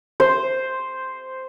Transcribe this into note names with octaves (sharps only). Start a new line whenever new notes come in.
C5